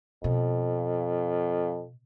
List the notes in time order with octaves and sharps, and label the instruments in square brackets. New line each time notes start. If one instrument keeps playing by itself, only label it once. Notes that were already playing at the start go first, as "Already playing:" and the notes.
[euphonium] F2 [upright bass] B2